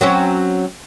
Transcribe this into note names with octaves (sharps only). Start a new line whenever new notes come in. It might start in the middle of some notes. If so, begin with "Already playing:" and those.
F#3 C4 C#4